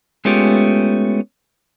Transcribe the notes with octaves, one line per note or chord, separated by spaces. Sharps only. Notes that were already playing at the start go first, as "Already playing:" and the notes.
G#3 A3 B3 C#4 F4 G4